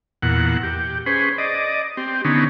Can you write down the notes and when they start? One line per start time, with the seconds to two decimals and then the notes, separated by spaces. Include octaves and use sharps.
0.22 E2 A#2 F#5
0.63 G4
1.06 C#4 G#4 B4 C5
1.38 D5 D#5
1.97 C4 G4
2.25 D3 B3 C#4 D#4